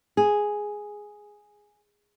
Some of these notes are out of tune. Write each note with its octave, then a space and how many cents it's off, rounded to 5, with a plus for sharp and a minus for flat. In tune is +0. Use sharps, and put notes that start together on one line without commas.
G#4 +0